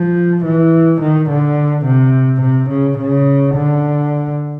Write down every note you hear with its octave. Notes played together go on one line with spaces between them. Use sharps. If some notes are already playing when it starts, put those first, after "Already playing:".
Already playing: F3
E3
D#3
D3
C3
C3
C#3
C#3
D3